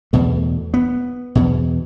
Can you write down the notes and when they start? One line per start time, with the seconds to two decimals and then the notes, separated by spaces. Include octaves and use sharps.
0.13 E2 B2 A3
0.74 B3
1.35 E2 B2